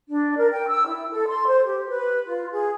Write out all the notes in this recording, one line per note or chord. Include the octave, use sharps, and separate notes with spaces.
D4
A#4
G5
E6
E4
A4
C6
C5
G4
B4
F4
G#4